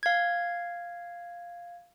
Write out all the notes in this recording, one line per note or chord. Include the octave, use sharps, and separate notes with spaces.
F5 G#6